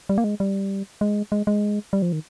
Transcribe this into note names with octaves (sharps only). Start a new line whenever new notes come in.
G3
A#3
G#3
G3
G#3
G#3
G#3
G3
F3
D#3